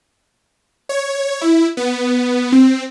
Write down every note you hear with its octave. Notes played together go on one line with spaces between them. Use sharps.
C#5
E4
B3
C4